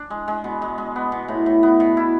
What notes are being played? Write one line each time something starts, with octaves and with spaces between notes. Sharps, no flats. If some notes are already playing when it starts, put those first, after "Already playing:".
Already playing: D4
G#3
G#3
B2
G#3
G#3
B3
B2
A2
A2
B3
B2
E4